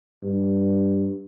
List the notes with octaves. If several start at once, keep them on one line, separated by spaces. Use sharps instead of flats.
G2